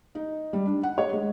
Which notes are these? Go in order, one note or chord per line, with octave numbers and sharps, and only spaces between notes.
D#4
G3
D4
F#5
C#5
G#3